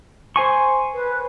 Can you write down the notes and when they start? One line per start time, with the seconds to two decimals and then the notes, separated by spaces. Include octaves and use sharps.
0.36 C5 G#5 C#6
0.94 B4